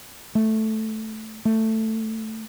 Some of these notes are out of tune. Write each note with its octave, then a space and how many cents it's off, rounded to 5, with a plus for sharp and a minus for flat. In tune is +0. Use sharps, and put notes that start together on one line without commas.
A3 -5
A3 +10